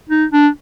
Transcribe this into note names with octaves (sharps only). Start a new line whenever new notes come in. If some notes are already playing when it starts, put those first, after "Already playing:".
D#4
D4